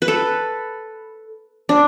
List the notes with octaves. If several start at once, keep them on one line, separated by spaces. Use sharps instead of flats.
B4
A4
D4